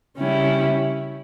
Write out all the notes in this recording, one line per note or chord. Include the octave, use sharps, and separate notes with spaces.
C#3 G3 C#4 E4 G4